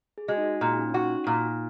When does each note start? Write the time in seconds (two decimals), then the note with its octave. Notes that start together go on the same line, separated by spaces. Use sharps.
0.18 G#4
0.28 G#3 F#4
0.37 D#4
0.45 F#4
0.61 A#2
0.73 D#4
0.78 C#4
0.89 C#4
0.93 D#4 F#4
1.27 A#2